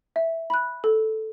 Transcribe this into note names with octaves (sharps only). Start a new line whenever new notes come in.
E5
B5 F#6
A4